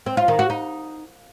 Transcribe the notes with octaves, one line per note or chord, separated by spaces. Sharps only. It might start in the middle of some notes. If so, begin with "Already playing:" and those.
C4
F4
D#3
F#4
D#4